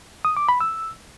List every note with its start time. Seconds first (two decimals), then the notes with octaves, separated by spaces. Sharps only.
0.25 D#6
0.37 D6
0.49 B5
0.61 E6